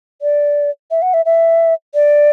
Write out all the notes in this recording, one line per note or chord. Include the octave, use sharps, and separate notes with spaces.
D5
E5
F#5
E5
E5
D5